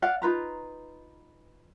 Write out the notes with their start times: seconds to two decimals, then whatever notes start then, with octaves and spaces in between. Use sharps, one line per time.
0.02 D5 F5 F#5
0.22 D#4 F4 B4 A#5